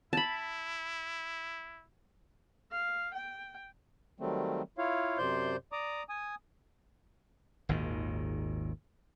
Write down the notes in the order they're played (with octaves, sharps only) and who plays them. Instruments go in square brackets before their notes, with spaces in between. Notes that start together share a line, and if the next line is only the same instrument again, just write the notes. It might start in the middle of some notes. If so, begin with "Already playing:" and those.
[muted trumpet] E4 [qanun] A5 B5
[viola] F5
G5
[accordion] D#3 F#3 G3 A3 C4
E4 F4 C#5 F5
F#2 C3 C5 D5 C6 G6
D5 A#5 D6 D#6
G#5 D#6
[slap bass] G#1 D#2 A#2 D#3